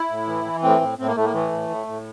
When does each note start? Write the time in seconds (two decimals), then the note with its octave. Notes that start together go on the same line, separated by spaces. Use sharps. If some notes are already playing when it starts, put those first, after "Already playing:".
Already playing: E4
0.10 A2
0.27 E3
0.45 E3
0.63 A2 C4
0.81 A2
0.98 A2 C4
1.07 A#3
1.16 A2 A3
1.24 A#3
1.34 E3 A3
1.52 A2
1.69 A2
1.87 A2